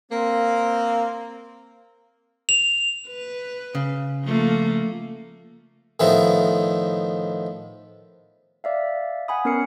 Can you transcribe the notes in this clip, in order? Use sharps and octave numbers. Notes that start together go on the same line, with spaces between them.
A#3 C4
F7
B4
C#3
F3 A3 A#3
A2 D#3 F3 B3 D#4 E4
D5 E5 F5
F#5 G#5 B5 D#6
B3 C#4 A#4 F6 C7 C#7